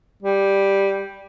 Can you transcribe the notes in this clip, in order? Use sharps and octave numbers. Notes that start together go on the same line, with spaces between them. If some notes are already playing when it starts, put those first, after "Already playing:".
G3